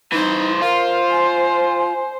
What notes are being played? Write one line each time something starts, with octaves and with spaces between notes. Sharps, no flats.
E3 D#4 C5
F4 A#4 C5
G#5